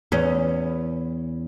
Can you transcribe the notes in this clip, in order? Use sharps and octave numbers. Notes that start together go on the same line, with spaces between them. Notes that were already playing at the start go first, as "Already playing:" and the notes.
E2 C#4